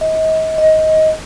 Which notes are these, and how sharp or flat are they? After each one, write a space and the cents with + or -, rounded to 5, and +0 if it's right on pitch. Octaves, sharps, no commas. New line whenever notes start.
D#5 +35
D#5 +15